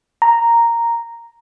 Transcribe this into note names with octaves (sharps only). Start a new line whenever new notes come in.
A#5